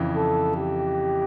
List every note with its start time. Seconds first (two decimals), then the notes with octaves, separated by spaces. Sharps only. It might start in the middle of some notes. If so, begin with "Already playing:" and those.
Already playing: F2 C#3 E3
0.16 A4
0.56 G4